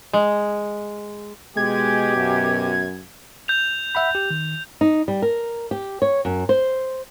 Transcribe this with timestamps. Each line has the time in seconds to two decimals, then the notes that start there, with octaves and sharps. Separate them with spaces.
0.13 G#3
1.57 B2 G#3 G4 G#6
2.16 F#2
3.48 G6 F7
3.95 E5 F#5 B5
4.15 G4
4.31 D#3
4.81 D#4
5.08 G3
5.22 A#4
5.71 G4
6.02 C#5
6.25 F#2
6.49 C5